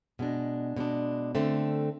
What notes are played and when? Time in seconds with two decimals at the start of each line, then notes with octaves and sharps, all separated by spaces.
0.19 B2 G#3 D4
0.76 B2 G#3 D4
1.35 D3 A3 C4